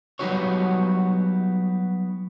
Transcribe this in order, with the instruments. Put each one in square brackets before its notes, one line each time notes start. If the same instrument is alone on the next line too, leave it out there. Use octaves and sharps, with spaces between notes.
[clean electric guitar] F#3 G3 B3 D#4 F#4 C#5